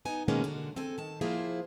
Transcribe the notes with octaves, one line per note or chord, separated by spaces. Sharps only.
B3 D#4 G#5
B2 D#3 G#3 A#3 B3 C#4
D3 F#4
C4 A4 G#5
D#3 A5
F3 A#3 E4 F4 G#4 C5